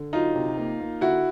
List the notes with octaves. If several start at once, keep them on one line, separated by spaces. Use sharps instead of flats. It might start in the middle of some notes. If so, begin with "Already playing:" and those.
Already playing: D3
F#3 D#4 F4
C3
A#3
A#3
D3 E4 F#4